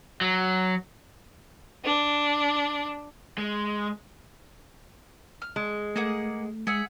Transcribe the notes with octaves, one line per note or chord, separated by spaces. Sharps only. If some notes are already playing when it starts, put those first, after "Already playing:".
F#3
D4
G#3
F6
G#3
A3 A#3 G#4 F#5
G#3 G#4 E5 F#5